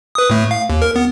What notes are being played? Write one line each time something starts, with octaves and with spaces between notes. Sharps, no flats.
B4 D#6
A2 A3
F5
D#2
A#4
B3